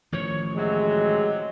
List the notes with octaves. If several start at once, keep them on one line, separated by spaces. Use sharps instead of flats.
A1 D#3 F3 C#5
C3 F#3 G#3